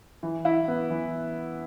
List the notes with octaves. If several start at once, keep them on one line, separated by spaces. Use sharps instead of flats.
E3
E4
B3
E3